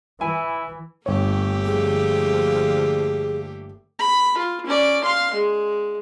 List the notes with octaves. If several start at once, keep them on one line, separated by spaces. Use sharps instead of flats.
E3 E4 G#5
G1 A3 A#3 G4 C#5
D3 F3 G#4
B5
F4
C#4 D5
F5 C6
G#3